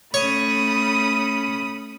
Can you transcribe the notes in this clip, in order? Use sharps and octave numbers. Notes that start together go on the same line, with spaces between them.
A3 C#4 C#5 B5 D#6